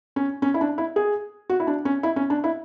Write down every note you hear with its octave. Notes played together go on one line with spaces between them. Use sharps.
C#4
C#4
E4
D4
E4
G#4
F#4
E4
D4
C#4
E4
C#4
D4
E4